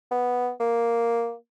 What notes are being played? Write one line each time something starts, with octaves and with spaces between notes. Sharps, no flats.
B3
A#3